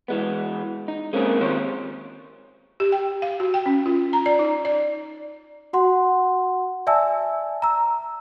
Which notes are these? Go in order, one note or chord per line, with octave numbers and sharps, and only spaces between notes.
E3 G#3 B3
D#4
G#3 A#3 C4 C#4 G#4
D#3 F3 C4 G4 C#5 C6
G4
G5
F5
F#4
G5
C#4
F4
A#5
D5
D#4
D5
F#4 F#5 C6
D5 E5 G#5 A5 E6
A#5 E6